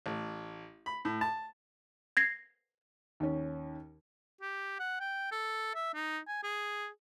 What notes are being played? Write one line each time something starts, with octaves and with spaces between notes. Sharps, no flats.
A1
B5
A2
A5
G#6 A#6 C7
D#2 C#4
G4
F#5
G5
A4
E5
D#4
G#5
G#4